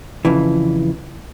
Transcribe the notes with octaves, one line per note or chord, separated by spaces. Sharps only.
F2 C#3 E3